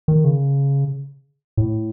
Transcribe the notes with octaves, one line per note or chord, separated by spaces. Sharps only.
D#3
C#3
A2